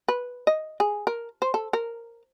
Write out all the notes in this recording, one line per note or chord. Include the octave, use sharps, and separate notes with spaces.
B4
D#5
G#4
A#4
C5
A4
A#4